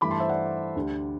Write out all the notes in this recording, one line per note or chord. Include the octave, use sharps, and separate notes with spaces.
G2 E3 A3 B5 D6
A5 C6
C5 E5
D5 F#5
D2 D3 G3